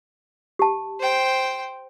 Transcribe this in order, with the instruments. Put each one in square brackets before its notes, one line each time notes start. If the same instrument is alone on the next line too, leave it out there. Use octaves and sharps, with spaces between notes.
[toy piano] G4 A5
[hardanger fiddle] C5 G5